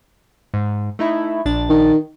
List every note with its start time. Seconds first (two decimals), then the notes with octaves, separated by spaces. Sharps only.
0.54 G#2
0.99 A3 D#4 E4
1.46 A#1 D4 A6
1.69 D#3